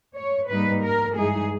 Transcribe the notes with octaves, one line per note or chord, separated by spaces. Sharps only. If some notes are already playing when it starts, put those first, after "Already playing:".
C#5
G#2 G3 A#3 D#4 B4
A#4
G2 E3 G#3 D#4 G#4